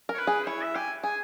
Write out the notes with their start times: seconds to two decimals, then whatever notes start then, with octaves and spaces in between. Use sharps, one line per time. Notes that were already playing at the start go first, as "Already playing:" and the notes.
0.09 A#4 C#5
0.18 B4
0.27 G#4
0.46 E4 C#5
0.62 E5
0.75 G4 G#5
1.03 G#4 G#5